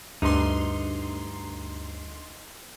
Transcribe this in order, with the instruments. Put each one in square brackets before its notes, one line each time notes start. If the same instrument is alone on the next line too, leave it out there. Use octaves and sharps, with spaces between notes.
[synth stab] D2 C6 [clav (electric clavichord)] G2 [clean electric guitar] D#4